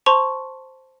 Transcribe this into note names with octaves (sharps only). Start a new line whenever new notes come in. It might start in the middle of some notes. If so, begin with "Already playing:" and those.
C5 A5 C6 C#6 F7